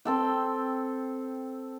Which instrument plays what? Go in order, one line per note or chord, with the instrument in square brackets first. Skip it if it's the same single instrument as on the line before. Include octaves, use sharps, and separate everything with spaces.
[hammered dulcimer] C4 A4 G5